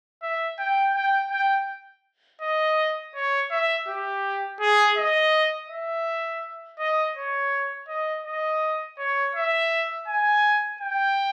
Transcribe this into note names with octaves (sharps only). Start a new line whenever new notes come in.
E5
G5
G5
G5
D#5
C#5
E5
G4
G#4
D#5
E5
D#5
C#5
D#5
D#5
C#5
E5
G#5
G5